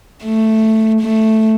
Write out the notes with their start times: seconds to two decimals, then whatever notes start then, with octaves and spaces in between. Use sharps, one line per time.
0.24 A3
1.01 A3